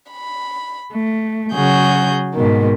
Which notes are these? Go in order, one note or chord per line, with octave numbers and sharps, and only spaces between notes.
B5
A3
C#3 F#3 F#4 G#4 G6
G#2 B2 D#3